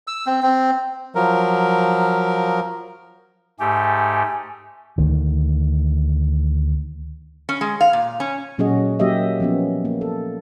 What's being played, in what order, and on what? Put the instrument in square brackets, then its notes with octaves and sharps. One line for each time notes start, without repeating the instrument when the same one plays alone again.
[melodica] E6
C4
C4
[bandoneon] F3 F#3 A#4
[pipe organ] G#2 A3 G4 [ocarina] G#5
[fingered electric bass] D2 D#3
[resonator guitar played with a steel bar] C#4
G#3
F5
A#2
C#4
[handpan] A#2 F#3 C#4 F#4 G#4 D#5
F#3 A#3 G4 D#5 E5
F3 B3 C#4
A#3
A4